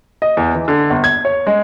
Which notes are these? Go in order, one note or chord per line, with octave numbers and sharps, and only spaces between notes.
D#5
E2
E3
D3
G1
G#6
C#5
G#3